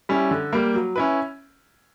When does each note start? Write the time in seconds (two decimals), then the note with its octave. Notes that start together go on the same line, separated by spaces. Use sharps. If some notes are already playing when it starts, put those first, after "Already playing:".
0.09 G3 C#4 E4
0.31 D3
0.53 G3 A#3
0.74 F#3
0.96 C#4 E4 B4